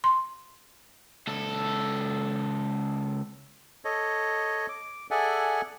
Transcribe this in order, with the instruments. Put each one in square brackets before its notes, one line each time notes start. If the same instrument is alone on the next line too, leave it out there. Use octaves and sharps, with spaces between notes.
[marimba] C6
[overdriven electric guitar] C#2 A4
[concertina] A4 C#5 D#5
D6
G#4 A4 D5 E5 F#5 G#5